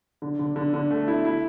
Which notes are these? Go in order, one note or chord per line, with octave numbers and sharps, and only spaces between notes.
D3
D3
D3
D3
A3
E4
E4